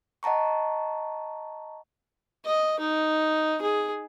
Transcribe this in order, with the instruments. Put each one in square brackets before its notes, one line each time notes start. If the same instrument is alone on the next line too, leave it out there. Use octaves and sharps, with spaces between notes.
[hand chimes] D#5 F#5 A5 A#5 C#6
[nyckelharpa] D#5
D#4
G#4